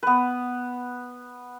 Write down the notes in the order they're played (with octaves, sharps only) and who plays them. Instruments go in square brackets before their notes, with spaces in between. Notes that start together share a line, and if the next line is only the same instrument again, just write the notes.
[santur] B3 B4